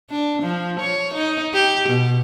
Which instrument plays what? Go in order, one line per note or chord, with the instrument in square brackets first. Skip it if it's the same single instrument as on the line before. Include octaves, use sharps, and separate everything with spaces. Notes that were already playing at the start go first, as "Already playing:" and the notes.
[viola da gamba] D4
F3
C#5
D#4
G4
B2